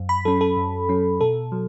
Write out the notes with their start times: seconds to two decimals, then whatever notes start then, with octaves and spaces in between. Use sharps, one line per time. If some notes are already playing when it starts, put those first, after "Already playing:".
Already playing: F#2
0.09 B5
0.25 F#3 C#4 A4
0.41 A4
0.57 F#2
0.89 F#3 C#4
1.21 B2 A4
1.52 F#3